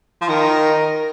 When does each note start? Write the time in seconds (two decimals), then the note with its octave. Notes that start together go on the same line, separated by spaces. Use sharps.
0.21 F3
0.28 D#3 A#4